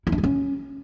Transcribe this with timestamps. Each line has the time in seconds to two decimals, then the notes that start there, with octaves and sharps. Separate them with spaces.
0.07 E4
0.12 D4
0.18 G3
0.24 C#4